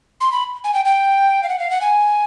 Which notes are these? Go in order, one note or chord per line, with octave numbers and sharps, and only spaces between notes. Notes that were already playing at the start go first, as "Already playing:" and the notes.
C6
B5
G#5
G5
G5
F5
F#5
F5
F#5
G#5